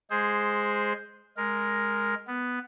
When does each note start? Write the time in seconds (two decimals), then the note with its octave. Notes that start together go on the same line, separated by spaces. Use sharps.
0.10 G#3 G#4 C5
1.37 G#3 A#4
2.27 B3